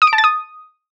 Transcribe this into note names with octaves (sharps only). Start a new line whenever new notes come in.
D#6
D7
A5
A6
D#6